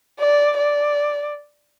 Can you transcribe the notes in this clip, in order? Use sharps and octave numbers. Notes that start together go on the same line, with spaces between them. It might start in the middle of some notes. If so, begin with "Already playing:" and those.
D5
D5